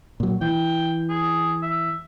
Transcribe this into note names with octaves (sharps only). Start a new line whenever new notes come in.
A#2 F#3
E3 G5
G#4
E5